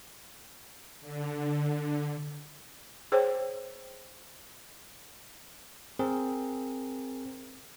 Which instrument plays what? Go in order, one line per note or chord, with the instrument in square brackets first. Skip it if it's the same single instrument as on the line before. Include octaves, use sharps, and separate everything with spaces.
[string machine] D3
[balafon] G#4 C5 C#5 G5
[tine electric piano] C4 G#4 A#4